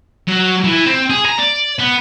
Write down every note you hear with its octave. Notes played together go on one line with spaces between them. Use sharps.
F#3
E3
C4
G#4
A#5
D5
B3